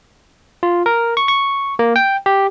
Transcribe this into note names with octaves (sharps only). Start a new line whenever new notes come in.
F4
A#4
C#6
C#6
A#3
G5
G4